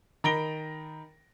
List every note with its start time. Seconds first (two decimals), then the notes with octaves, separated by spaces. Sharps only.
0.24 D#3 A#5 B5 A#6 D7 G7